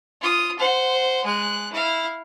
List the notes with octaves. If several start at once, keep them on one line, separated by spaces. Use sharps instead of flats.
F4 D#6
C5 F#5
G#3 F#6
E4 F5